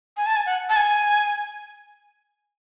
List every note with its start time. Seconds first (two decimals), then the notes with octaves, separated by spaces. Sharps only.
0.17 G#5
0.26 A5
0.36 G#5
0.46 F#5
0.69 A5
0.76 G#5